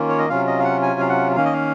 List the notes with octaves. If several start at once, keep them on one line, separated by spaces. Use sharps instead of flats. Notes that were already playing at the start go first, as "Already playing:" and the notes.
Already playing: D#3 A#3 C#4 F4
C#5
D#5
C3 F#3 C#4 F4 F5
D#5
F5
F#5
G#5
F5
F#5
D#3 A#3 C#4 F5
D#5
F5